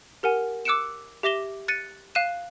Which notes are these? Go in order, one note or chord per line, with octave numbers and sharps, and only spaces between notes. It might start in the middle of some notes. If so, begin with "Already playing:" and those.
G4 A#4 F#5 G#5
D6 E6 F#6 C#7 D7 E7
G4 E5 D6 A#6 E7 G7
F#6 A6 C#7 D#7
F5 F#6 D#7 E7